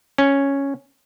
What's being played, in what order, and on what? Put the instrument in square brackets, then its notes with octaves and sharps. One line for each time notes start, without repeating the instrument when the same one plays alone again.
[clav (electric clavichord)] C#4